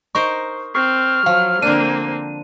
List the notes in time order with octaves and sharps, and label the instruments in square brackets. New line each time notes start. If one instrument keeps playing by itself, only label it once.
[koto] D#4 A#4 C5 [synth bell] C#6
[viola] C4 [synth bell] C#6 [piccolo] F6
[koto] F3 [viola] F#3 [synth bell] F5
[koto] D3 D4 [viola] A#3 C4 [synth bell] D#7